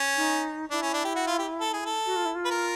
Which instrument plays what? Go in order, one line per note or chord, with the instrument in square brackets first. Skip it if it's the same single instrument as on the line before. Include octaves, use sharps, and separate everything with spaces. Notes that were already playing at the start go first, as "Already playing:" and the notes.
Already playing: [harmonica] C#4
[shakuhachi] D#4
[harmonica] D4 [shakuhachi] E4
[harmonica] C#4
D4
G4
F#4
F4
G4
A4
G#4
A4
[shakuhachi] F#4
F4
E4
F4
[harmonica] B4
A#4